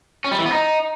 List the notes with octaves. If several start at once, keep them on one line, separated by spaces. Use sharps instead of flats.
C#4
G3
E3
B3
D#4